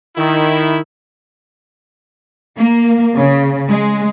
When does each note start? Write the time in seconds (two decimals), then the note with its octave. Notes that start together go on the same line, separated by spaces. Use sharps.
0.17 D#3 E4
2.56 A#3
3.16 C#3
3.69 G#3